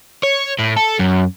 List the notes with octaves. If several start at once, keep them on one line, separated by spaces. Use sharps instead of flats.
C#5
A2
A4
F#2